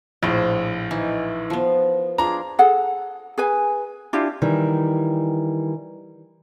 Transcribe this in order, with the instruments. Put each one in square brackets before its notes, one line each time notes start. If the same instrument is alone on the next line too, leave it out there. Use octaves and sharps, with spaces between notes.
[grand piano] A#1 A2 [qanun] F4 C5
[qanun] E3 D#4 E4
F3 B3
[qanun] D4 F4 G#4 [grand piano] A#5
[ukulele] G#4 A4 F#5
G#4 B4 G#5
D4 E4 F4 G4
[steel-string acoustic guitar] D#3 E3 G3